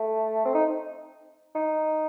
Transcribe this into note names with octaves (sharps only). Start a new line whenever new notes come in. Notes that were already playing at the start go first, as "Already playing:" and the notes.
Already playing: A3
C4
D#4
D#4